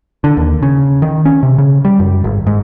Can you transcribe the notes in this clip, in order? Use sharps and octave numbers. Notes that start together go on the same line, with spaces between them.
D3
D#2
C#3
D#3
C#4
C3
C#3
G3
F#2
G#1
G#2